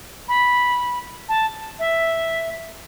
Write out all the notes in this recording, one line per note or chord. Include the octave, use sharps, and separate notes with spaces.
B5
A5
E5